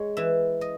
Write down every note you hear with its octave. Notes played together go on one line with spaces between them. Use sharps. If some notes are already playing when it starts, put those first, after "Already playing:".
Already playing: G#3 C#5
E3 E5
D#5